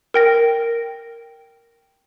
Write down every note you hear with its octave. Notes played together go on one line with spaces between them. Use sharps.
A#4 G5 A#6